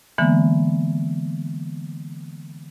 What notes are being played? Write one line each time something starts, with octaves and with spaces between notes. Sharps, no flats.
D3 E3 G#3 A#3 B3